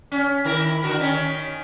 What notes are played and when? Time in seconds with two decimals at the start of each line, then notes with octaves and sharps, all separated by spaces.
0.12 C#4
0.44 D#3 E4 A#4
0.83 D3 F#4 A#4
0.99 D#3 C#4